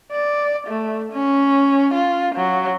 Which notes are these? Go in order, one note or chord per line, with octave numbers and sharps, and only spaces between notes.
D5
A3
C#4
F4
F#3